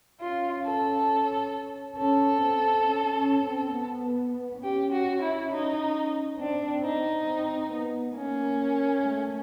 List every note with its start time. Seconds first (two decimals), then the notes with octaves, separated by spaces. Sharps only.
0.20 C#4 F4
0.64 A4
1.97 C#4 A4
2.42 C4
2.86 C#4
3.15 C#4
3.45 C4
3.74 B3
4.63 C#4 G4
4.92 F#4
5.22 E4
5.51 D#4
6.39 C4 D4
6.69 C4
6.84 D#4
6.98 C4
7.29 C4
7.73 B3
8.16 A#3 C#4
9.05 A3